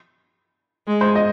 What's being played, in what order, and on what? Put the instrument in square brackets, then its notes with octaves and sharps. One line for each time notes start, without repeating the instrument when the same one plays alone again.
[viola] G#3
[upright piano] C5
D#5